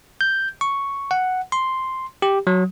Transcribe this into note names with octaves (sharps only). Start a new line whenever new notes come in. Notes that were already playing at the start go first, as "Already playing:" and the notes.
G6
C#6
F#5
C6
G4
F#3